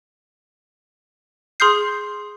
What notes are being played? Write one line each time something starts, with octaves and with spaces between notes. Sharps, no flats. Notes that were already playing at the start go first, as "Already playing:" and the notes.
G#4 C6 D#6 F6 G6 C7